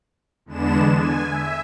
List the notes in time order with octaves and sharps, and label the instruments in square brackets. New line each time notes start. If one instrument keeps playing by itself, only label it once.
[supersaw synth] E2 D3 G#3 B3 D4 E7
G#5
E5